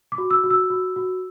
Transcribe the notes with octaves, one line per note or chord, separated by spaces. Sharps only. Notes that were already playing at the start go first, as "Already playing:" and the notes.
D6
F#4
E6
F#4
E6
F#4
F#4